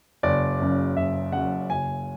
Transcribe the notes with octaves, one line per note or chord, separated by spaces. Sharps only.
F#1 D5
F#2 C#3
F#1 E5
F#2 C#3 F#5
F#1 G#5